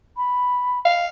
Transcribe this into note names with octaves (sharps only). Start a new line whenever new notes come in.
B5
F5